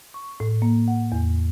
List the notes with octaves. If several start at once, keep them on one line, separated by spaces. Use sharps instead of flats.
C#6
A2
A#3
F#5
E2